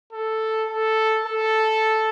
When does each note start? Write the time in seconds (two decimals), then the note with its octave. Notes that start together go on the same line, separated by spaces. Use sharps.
0.13 A4
0.69 A4
1.26 A4